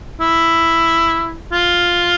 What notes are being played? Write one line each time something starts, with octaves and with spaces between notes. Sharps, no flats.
E4
F4